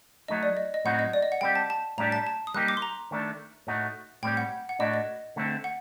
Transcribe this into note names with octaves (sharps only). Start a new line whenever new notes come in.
F#3 A3 D#4 D#5
D5
D#5
D#5
A2 F#3 C4 D#4 F#4 F#5
D#5
D5
D#5
F#5
G3 C4 G4 G5
A5
A5
A2 G3 D4 G4 A#5
A5
A5
D#6
G3 A#3 D#4 G4 F#6
D6
C6
A#5
D#3 A3 D4
A2 A3 D#4 F#4
A2 G3 C4 G4 G5
F#5
F#5
A2 A3 D4 F#4 D#5
D#5
D3 A3 C4
F#5